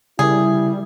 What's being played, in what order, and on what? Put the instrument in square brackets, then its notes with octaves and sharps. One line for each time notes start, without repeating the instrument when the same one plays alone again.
[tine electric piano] C#3 A#4 [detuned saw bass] G3 [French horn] E4 [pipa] G#4